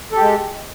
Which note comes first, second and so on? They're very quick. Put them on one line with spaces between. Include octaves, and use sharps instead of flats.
A4 G4 G#3